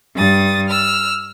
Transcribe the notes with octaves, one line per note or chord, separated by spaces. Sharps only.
G2 D#6 A6
E6 F6